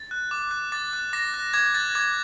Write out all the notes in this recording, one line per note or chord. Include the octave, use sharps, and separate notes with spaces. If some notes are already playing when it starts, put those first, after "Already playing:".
Already playing: A6
F#6
D6
F#6
D6 A6
F#6
D6 A#6
F#6
D6 G#6
F#6 A6
D6 G#6